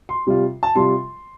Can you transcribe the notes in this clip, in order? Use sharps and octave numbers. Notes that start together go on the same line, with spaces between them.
C6
C3 G3 F4
A5
C3 G3 F4 C6